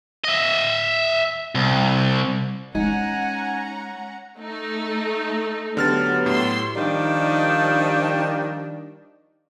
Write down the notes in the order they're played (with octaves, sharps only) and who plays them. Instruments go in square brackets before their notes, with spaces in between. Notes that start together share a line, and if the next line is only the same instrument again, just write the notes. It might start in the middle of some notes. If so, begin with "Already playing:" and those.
[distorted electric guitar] D#5 E5
C2
[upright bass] G#3 [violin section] C#4 F#5 A#5 [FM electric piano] D#4 [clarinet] G#5
[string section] A3 D#4
[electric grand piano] D3 F6 A6 [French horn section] F#3 B3 G4
[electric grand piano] A2 [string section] C6 E6
[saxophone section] D#3 F3 G3 D4 D#4